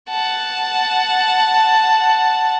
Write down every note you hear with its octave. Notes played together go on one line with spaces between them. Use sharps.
F#5 A5